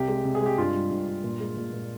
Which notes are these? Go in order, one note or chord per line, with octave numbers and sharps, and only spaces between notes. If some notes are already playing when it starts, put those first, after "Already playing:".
Already playing: C2 G4
G#3
C2
G#4
G#3 G4
G2 F4
G3
G2
G2
A#2
G#3
A#2
A#2